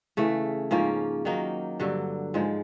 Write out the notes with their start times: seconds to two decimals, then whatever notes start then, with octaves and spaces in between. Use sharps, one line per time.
0.17 C#3 E3 A3
0.71 G#2 F3 A#3 C#4
1.25 D#3 F#3 A#3 D#4
1.80 G2 D3 F#3
2.34 G#2 F3 G#3